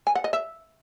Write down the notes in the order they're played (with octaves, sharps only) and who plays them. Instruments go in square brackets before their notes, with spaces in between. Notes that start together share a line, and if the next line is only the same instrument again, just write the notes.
[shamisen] G#5
F#5
D#5
E5